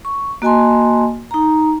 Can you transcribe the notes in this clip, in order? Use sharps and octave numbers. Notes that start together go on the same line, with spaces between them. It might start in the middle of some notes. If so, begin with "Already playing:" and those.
C#6
A#3 F#4 D#5 G#5 A5 C6
D#4 A#5